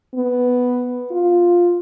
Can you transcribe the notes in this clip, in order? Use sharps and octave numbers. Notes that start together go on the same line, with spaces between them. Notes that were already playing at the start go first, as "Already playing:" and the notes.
B3
F4